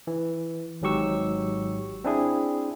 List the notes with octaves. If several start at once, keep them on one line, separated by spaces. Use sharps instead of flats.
E3
G#1 G#2 F#3 G4 C#6 E6
C4 D4 E4 G#4